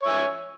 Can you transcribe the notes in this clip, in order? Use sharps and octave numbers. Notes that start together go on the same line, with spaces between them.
C#5 E5 G#5